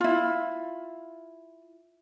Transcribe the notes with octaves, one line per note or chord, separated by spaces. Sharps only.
E4 F4